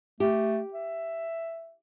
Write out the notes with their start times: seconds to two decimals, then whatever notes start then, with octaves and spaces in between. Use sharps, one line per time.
0.20 A3 G4
0.73 E5